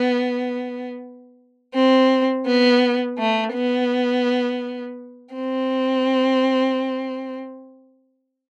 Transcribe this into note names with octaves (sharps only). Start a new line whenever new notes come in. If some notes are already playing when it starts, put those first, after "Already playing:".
Already playing: B3
C4
B3
A3
B3
C4